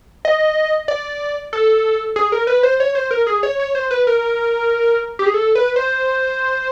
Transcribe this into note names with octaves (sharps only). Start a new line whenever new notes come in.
D#5
D5
A4
G#4
A#4
B4
C5
C#5
C5
A#4
G#4
C#5
C#5
C5
B4
A#4
G4
G#4
A4
B4
C5